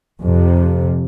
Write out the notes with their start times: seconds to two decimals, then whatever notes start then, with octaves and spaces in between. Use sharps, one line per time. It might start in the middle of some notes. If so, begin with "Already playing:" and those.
0.21 F2 C3